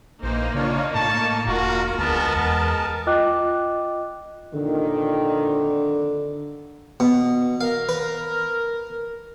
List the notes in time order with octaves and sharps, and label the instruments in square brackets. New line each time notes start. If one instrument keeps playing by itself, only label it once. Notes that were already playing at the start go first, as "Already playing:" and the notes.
[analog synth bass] A#1 [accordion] E3 C5 [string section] A#3 D#4
[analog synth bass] C#3 [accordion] D4 F4 C#5
[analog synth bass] A2 [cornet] A5 [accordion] C#6
[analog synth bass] E1 [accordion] F4 A#4 [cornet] F#4
[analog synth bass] D2 [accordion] G#3 A#4 A5 [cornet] B3
[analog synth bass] E2 [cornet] B3
[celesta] F4 D#5 G5 D6 F#6
[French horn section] F2 A#2 D#3 [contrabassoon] D3
[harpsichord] B2
[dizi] A#4 [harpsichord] F5
[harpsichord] B4